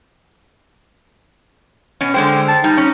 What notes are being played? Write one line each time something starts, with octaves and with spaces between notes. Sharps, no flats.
B2 C#4
D3 G#3 C5 G5
A5
G3 D#4
C#4